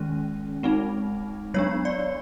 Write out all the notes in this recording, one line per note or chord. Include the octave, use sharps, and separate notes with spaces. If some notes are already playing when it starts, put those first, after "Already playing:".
Already playing: D#3 G#3 C#4
G#3 C4 D#4
F#3 B3 D4 C#5
D5